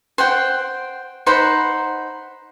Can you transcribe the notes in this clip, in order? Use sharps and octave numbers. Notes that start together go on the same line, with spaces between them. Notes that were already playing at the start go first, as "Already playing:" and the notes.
C5 F#5 G5
D#4 C5 F#5 B5